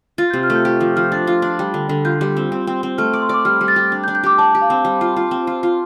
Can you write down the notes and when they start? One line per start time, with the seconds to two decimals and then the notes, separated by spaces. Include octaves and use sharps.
0.18 F4 A6
0.30 C3 G6
0.43 F6
0.50 A3
0.55 G6
0.65 G4
0.81 F3
0.96 F3 F6
1.04 G6
1.12 D4 A6
1.27 F4
1.42 D4
1.59 G3
1.74 D3
1.89 D3
2.05 F4 G6
2.21 G3
2.37 C4
2.52 C4
2.67 C4
2.83 C4
2.98 A3 F6
3.13 D5
3.22 C6
3.29 D5 D6
3.45 G3 F6
3.61 G3
3.68 A6
3.76 G4
3.92 D4
4.04 G6
4.08 D4
4.15 G6
4.24 G4 D6
4.38 D5 A5
4.55 G4
4.62 F5
4.70 C4
4.85 G3
5.01 F4
5.16 F4
5.31 C4
5.47 F4
5.63 F4